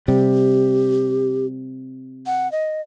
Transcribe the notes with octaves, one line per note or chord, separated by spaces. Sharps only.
C3 G3 G4
F#5
D#5